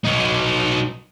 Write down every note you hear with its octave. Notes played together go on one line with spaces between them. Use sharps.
F#3 D#4